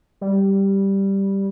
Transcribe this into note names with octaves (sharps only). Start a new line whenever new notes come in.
G3